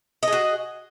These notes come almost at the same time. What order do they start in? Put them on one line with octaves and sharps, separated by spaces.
D#5 G#4 F#4